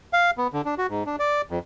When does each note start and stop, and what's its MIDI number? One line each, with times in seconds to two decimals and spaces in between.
0.13 0.31 77
0.38 0.47 59
0.53 0.62 50
0.65 0.75 62
0.78 0.87 66
0.90 1.04 44
1.06 1.16 62
1.19 1.42 74
1.51 1.59 41